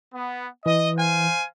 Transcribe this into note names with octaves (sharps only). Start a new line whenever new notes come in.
B3
E3 D#5
C5 F5 G#5